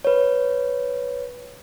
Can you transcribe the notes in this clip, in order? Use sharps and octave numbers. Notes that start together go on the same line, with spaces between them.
B4 C#5